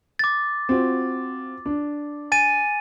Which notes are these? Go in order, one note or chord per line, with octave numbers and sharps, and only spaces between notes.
D6 A6
C4 F4 F#4
D4
G#5 A6 D#7